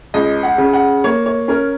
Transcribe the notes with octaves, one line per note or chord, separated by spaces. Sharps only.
C#2 D#5
F#5
C#3
F#5
A#3 C#5
C#5
C#4 A#4